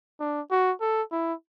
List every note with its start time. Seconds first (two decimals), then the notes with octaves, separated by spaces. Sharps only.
0.20 D4
0.51 F#4
0.81 A4
1.12 E4